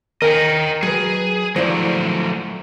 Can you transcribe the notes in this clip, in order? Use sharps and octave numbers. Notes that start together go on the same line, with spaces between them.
D#2 A#4 D#5 G5 G#5 C#7
F#3 G#4 B4 D#7
F3 F#3 A3 E4 C5 D5